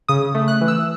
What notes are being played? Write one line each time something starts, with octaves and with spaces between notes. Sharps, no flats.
C#3 D#6
A3
F#6
E3
E6